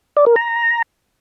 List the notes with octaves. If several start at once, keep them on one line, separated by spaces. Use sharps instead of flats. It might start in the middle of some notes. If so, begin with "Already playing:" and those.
D5
A#4
A#5